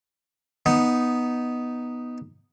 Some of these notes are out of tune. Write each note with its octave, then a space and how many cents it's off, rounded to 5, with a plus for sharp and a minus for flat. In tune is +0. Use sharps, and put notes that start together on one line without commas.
B3 -5 D#4 +0